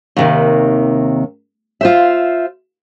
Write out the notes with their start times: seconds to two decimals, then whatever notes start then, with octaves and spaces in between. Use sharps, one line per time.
0.17 D#2 C3 D#3
1.81 F4 C5 E5